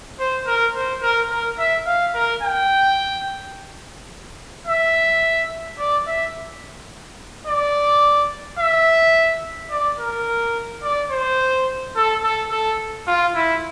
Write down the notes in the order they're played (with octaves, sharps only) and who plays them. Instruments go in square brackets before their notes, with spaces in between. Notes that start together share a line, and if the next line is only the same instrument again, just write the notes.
[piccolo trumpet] C5
A#4
C5
A#4
A#4
E5
F5
A#4
G5
E5
D5
E5
D5
E5
D5
A#4
D5
C5
A4
A4
A4
F4
E4